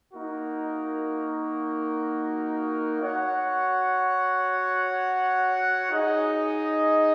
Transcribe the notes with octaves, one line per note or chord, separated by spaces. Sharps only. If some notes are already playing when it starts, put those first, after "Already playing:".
A#3 D#4 F#4 A#4
F#4 C#5 F#5
D#4 G#4 D#5